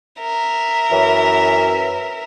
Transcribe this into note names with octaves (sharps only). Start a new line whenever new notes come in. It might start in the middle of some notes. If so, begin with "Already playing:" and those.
A#4 E5
F#2 E3